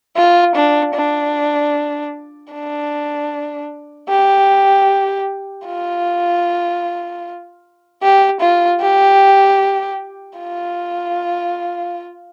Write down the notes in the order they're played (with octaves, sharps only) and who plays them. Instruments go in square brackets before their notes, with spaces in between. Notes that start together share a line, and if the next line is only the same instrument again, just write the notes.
[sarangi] F4
D4
D4
D4
G4
F4
G4
F4
G4
F4